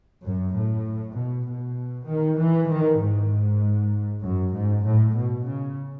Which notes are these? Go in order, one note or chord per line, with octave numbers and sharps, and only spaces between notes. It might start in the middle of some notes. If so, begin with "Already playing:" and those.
F#2
A2
B2
B2
D#3
E3
D#3
G#2
F#2
G#2
A2
B2
C#3